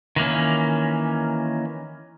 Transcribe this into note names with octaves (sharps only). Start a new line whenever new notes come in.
D#3 E3 A#3 C#4